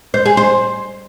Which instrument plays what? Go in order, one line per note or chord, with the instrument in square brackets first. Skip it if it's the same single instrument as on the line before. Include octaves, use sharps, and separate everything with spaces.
[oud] C5
G#4
C5